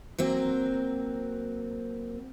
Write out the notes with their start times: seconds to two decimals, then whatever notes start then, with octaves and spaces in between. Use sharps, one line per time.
0.19 F#3 A#3 C4